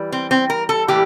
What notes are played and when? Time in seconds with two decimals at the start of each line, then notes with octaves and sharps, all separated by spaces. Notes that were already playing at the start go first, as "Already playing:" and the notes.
Already playing: E3 G3
0.12 C4
0.31 C4
0.50 A#4
0.69 A4
0.88 A2 E3 G3 A#3 G4